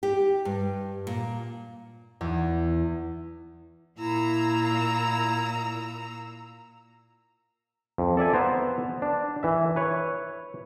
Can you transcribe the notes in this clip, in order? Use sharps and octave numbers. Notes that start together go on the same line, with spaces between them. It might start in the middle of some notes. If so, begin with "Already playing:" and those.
G4
G2
A#2
E2
A#2 E4 A#5 E6
F2
A4 D5 E5 G#5
B3 C5 A#5
D4
E3 E5
B4 C#5